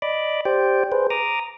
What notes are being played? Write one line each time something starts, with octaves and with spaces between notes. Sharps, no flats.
D5 D#5 B5 D6
G4 C5 D5 G5
G#4 B4 C5
A#5 D6 D#6